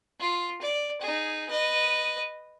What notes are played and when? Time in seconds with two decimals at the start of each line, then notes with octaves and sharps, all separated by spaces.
0.20 F4
0.62 D5
1.01 D#4 G#4
1.49 B4 D#5